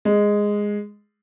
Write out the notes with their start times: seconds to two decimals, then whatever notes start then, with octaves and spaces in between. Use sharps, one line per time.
0.05 G#3